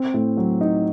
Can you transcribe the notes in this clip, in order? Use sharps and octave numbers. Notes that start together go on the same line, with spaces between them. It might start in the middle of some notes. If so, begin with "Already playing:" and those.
Already playing: C4
A2
F#3
D#4